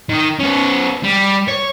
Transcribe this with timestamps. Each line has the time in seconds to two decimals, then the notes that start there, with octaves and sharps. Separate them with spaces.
0.09 D#3 D#4
0.39 B3 C#4
1.04 G3
1.48 C#5